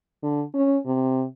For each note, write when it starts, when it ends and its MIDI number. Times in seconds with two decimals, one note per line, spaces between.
0.23 0.43 50
0.54 0.78 61
0.86 1.24 48